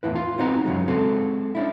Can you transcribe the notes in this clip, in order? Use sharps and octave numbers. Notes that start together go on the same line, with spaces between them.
E2 A2 E4 B4
F4
B3 C4 D#4 F#4 A#5
F#2 C#3 F#3 G#3
G#3 C4 F#4 A4
C#4 D4 E4